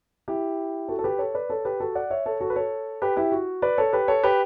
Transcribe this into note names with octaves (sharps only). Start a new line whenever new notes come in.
E4 G4
F#4 A4
A4
G4 B4
A4 C#5
B4 D5
A4 C#5
G4 B4
F#4 A4
D5 F#5
C#5 E5
A4 C#5
F#4 A4
B4
A4 C#5
G4 B4
E4 G4
F#4
B4 D5
A4 C#5
G4 B4
A4 C#5
G4 B4